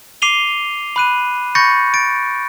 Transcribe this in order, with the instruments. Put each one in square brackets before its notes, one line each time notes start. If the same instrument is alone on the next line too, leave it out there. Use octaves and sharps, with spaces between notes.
[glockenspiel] D6 C7 D#7 F7 G7
B5 F#6 D#7
B5 C#6 G6 A6 A#6 C#7
A6 D7